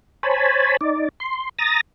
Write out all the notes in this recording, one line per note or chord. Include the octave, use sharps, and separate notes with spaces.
C5 C#5 G#5 A5 B5
D#4 D5
C6
A#5 D#6 A6 A#6